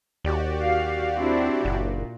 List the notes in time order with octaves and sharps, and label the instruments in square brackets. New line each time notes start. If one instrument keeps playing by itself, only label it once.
[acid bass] D#2 [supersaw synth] F#4 G4 D5
[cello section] F5
C4 D4 E4
[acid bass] F#1 [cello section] A#2